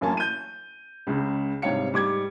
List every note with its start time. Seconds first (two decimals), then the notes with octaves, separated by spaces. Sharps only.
0.01 A1 F#2 A#3 C#4 G#5 A5
0.17 G6 D#7
1.07 C#2 C#3
1.62 G#2 C3 G3 C#5 F5 C#7
1.93 G#2 G3 D6 G#6